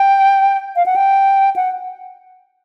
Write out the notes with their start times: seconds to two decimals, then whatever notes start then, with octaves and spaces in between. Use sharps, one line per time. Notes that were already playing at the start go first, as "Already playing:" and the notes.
Already playing: G5
0.76 F5
0.86 F#5
0.96 G5
1.56 F#5